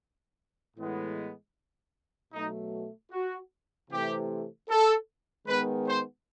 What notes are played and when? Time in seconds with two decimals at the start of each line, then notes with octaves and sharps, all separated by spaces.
0.77 A2 E3 G#3 B3
2.33 B2 F#3 A3 D#4
3.12 F#4
3.91 C3 E3 A3 G4
4.69 A4
5.47 D#3 G#3 B3 B4
5.87 C5